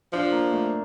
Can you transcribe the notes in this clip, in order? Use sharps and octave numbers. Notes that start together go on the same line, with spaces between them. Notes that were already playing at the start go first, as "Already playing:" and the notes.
F3 D4
A#3
A3